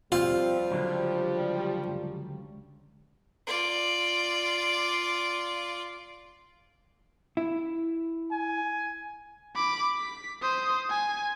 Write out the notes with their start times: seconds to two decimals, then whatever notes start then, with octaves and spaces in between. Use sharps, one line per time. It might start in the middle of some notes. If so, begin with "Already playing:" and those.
0.12 F3 G3 C4 F4
0.71 C#2 D3 F#3
3.47 F4 D5
7.37 E4
8.31 G#5
9.55 B5 D6
9.96 B6
10.42 C5 D#6
10.90 G#5